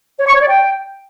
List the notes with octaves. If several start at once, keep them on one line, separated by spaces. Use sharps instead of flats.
C#5
C#6
C#5
D5
G5